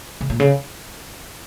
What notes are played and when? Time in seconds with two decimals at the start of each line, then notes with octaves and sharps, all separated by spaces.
0.21 C#3
0.30 A#2
0.40 C#3